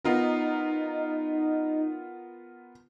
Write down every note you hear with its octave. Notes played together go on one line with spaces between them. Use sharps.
B3 D#4 F4 A#4